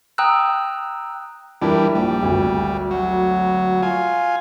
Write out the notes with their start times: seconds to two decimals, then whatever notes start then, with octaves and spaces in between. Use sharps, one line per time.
0.18 G5 A#5 D#6 E6 F#6
1.62 E3 G3 D4 E4 A#4
1.95 A#1 G3
2.23 G#1 D2
2.91 F#3
3.82 F4 G#5